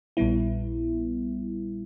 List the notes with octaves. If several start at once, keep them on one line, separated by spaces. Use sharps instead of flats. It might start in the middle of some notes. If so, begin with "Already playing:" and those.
A#1 A#2 G3 B3 E4